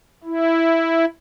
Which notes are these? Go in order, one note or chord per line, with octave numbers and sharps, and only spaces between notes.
E4